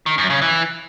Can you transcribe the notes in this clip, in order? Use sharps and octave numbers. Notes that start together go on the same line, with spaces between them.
D#3
F#2
C#3
E3